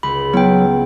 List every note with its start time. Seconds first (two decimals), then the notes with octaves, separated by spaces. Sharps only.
0.03 C#2 B5
0.33 F#3 B3 E4 G5